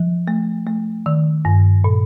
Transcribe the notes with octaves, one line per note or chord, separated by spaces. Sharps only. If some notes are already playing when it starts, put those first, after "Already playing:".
Already playing: F3
A3
A3
D#3
G2
A#2